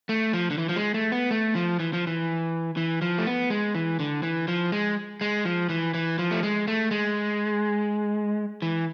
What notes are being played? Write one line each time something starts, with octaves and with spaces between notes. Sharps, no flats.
A3
F3
D3
E3
F3
G#3
A3
B3
A3
F3
E3
F3
E3
E3
F3
A3
B3
G#3
E3
D3
E3
F3
G#3
G#3
F3
E3
E3
F3
A3
G#3
A3
G#3
E3